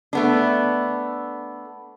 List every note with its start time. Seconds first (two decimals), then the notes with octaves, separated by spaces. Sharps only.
0.13 A3 B3 D4